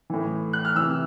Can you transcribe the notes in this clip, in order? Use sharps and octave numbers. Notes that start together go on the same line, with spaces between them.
A2 E3
F#6
F6
C3 E3 E6